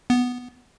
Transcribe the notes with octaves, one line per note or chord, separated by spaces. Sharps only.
B3